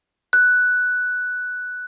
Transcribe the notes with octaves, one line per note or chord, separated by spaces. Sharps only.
F#6